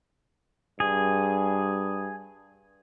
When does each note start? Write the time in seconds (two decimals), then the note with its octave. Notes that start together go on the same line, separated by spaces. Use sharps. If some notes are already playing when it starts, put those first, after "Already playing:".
0.80 G2 G#4